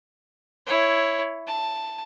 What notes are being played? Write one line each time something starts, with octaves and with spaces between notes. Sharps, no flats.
E4 C#5
A5